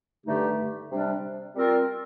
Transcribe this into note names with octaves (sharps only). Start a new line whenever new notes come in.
G2 D3 A3 D#4 G4
C3 G3 D4
G3 C4 F4 A#4 D5